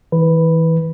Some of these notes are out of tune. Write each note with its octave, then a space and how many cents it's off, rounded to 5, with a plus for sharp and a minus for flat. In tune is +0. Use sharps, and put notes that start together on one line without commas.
E3 -35 B4 +0